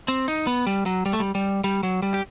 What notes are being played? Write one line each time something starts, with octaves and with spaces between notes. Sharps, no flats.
C4
D#4
B3
G3
F#3
G3
A3
G3
G3
G3
F#3
G3
G4